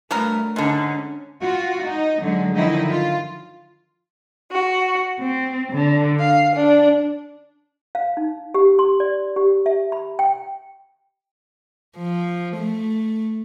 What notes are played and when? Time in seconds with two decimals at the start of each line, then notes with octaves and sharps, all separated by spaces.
0.11 G2 F#3 A3 B3 A#4
0.56 G#2 D3 C#4
1.42 F4 F#4
1.84 D#4
2.20 D3 F#3 G#3
2.56 D3 D#3 F3 F#3 D#4 E4
2.90 F4
4.52 F#4
5.17 C4
5.70 D3
6.20 F5
6.55 D4
7.95 F5
8.17 D#4
8.54 G4
8.79 C6
9.00 D5
9.36 G4
9.66 E5
9.92 B5
10.19 G5
11.97 F3
12.57 A3